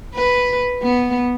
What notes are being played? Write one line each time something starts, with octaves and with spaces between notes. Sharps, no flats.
B4
B3